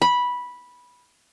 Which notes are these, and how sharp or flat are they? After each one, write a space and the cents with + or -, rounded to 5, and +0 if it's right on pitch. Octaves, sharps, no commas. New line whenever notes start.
B5 -10